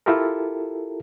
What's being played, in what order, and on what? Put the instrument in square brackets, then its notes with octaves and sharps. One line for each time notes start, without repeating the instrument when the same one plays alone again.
[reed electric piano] E4 F4 G4 A4 A#4